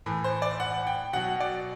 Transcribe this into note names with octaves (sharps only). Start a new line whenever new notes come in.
A2 E3
C5
D5
F#5
G5
B2 F#3 F#5
D5